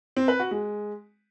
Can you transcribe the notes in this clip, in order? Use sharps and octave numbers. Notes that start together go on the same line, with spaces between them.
C4
B4
F#4
G#3